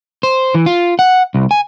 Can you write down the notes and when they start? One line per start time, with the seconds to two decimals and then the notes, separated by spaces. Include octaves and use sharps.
0.23 C5
0.54 E3
0.66 F4
0.99 F#5
1.34 C2
1.51 G#5